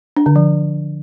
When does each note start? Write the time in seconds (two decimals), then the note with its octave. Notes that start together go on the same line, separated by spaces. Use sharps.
0.17 D4
0.26 D3
0.36 F3